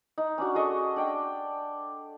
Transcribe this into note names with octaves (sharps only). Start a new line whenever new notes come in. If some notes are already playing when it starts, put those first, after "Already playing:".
D#4
C#4 D4 F#4
G#4 A4 D#5 C#6
D4 G5